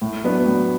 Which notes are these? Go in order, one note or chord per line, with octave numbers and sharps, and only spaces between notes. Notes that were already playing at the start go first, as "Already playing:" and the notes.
A2
F#3 B3 D4
A2